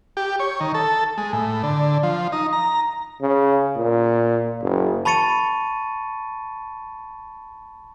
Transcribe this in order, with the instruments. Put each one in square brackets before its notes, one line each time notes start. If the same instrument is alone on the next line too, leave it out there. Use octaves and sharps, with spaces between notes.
[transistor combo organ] G4
C#5
D#3
A4
G#3
A2
D3
F3
D#4
A#5
[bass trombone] C#3
A#2
F#1
[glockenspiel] A5 B5 C#6 A6 C#7 D#7